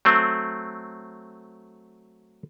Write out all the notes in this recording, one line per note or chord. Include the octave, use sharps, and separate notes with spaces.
F#3 A3 C4